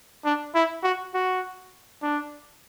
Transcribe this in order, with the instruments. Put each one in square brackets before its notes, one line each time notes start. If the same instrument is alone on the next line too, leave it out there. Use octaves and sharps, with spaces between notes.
[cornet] D4
E4
F#4
F#4
D4